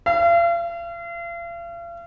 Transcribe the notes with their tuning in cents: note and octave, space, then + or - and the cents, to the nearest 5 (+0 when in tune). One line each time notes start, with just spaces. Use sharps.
F5 -40